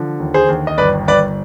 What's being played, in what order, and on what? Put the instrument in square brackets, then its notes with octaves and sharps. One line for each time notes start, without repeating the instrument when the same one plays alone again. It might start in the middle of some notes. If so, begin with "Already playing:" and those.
Already playing: [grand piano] D3 F3
D#2
G#4 C5
D#2
D#5
G1 B4 D5
G1 B4 D5